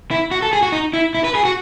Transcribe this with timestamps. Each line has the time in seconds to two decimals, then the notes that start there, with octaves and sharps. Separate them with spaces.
0.11 E4
0.31 F#4
0.42 A4
0.53 G#4
0.63 F#4
0.72 D#4
0.93 E4
1.15 E4
1.24 B4
1.35 G#4
1.45 F#4